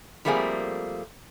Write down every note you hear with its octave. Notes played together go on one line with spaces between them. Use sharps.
F3 G3 A3 A#3 C4 G#4